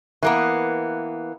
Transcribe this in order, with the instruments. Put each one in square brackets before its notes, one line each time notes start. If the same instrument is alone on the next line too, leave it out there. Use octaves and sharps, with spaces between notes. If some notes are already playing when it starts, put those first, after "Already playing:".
[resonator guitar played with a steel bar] E3 A#3 B3